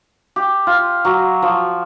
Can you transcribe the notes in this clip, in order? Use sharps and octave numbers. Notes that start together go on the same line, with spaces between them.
G4
F4
F#3
F3